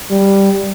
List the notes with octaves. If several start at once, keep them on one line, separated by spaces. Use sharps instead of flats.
G3